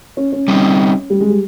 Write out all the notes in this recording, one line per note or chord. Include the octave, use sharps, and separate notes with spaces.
C#4
C#4
G3 C4 D#4
G3
G#3
G3